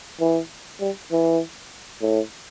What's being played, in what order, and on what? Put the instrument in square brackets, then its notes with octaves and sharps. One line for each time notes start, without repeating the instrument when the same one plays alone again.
[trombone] E3
G3
E3
A2